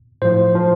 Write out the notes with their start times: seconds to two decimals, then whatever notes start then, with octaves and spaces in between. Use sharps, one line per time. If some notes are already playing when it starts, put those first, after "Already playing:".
0.22 A2 F3 C5
0.55 F3